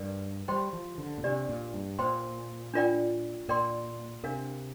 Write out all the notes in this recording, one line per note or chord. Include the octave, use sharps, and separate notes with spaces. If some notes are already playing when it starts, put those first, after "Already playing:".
Already playing: G2 A#4 D5
G3 G4 C5 G5 C6
F3
D3
A#2
C3 D4 G4 D5
A#2
G2
A#2 C5 G5 C6
D4 F4 A#4 D5 G5
A#2 A#4 D5 G5 C6
C3 D4 A#4 F5